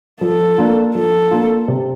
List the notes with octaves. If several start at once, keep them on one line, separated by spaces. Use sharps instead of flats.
F3 A4
A#3 D4 F4
F3 A4
A#3 D4 F4
C3